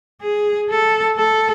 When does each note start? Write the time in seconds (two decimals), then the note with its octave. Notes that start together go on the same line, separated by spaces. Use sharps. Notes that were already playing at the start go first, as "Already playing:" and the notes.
0.22 G#4
0.70 A4
1.18 A4